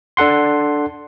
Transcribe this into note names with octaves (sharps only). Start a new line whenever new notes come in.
D4 A4 F#5 C6